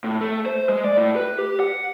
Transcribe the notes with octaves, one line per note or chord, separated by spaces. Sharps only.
A2
A3
C5
G#3
D5
A2
B4
G4
F#5